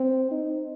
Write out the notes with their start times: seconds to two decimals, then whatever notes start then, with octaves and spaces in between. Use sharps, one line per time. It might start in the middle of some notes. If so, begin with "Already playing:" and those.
Already playing: C4
0.31 D#4